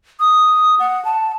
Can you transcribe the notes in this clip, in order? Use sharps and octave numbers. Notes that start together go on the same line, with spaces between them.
D#6
F#5
A5